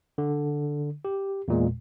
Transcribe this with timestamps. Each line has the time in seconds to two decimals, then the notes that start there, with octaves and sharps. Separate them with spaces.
0.18 D3
1.05 G4
1.48 E2 A#2 G#3